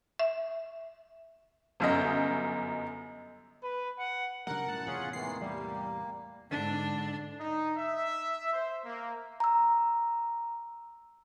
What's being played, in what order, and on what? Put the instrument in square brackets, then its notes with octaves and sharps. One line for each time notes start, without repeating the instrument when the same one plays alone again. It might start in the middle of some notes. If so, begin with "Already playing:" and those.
[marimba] E5
[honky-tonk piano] G1 F#2 D#5
[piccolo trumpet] B4
F#5
[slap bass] C#3 F#3 G3 [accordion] A#4 [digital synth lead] F#5
[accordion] F#2 A5 [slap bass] A2
[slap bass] E2 A2 C3 [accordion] C#4 F4 G#4
[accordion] D#3 E3 G#3 [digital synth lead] C7
[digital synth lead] G3 [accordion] A#3
[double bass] G#2 [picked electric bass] D3 [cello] D4
[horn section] D#4
E5
C5
A#3
[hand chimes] A#5 E6